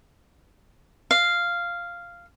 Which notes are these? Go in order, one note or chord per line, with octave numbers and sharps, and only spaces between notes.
F5